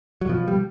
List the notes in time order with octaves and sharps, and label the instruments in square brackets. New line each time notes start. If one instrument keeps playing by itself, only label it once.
[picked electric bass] F#3
B2 F3
G3